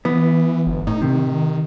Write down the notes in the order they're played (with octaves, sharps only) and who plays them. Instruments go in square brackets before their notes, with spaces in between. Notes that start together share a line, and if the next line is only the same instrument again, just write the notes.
[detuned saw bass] E3 [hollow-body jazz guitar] B3
[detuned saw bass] G1
[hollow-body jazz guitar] A2 [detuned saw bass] D#4
[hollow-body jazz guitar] C3 [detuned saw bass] D#3